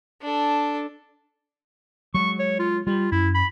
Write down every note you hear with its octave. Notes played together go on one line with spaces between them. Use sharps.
D4 A4
F#3 G#3 C#6
C#5
F4
G3 F4
F#2 E4
B5